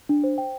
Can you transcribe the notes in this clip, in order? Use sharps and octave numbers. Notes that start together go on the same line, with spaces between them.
D4
C5
G5